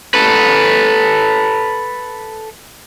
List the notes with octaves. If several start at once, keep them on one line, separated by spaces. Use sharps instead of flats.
A4 B4